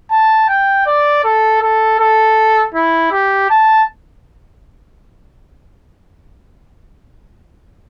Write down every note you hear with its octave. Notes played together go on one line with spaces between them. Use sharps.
A5
G5
D5
A4
A4
A4
E4
G4
A5